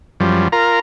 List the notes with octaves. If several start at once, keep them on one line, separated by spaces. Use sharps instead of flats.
F#2 F3 G3
F4 A#4 A#5